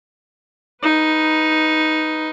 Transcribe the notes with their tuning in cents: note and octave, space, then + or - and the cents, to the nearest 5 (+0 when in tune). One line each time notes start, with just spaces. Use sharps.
D#4 +5 B4 +0